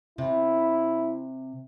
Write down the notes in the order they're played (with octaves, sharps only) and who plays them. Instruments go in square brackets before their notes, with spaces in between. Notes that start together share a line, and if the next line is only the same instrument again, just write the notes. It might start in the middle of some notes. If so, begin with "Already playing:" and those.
[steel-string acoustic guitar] C3 [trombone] E4